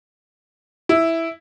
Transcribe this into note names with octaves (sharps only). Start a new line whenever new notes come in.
E4